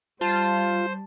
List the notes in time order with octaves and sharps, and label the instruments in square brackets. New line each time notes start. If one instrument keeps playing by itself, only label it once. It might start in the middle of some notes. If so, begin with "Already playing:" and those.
[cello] G3 [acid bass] F4 [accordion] C5 [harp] A5